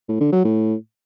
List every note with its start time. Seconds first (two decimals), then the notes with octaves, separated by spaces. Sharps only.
0.08 A2
0.20 D3
0.32 F#3
0.44 A2